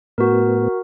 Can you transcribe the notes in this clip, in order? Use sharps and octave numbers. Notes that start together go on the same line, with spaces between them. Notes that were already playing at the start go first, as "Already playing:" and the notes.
A2 B3 F#4 A#4